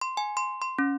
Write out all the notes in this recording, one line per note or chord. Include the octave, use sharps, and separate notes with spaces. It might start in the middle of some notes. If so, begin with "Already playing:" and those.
C6
G#5
C6
C6
C#4